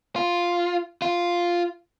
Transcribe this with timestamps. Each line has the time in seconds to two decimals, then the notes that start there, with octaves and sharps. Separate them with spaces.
0.16 F4
1.02 F4